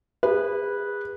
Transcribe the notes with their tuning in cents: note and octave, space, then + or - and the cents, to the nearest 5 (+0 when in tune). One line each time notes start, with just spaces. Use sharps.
G#4 -35 B4 -10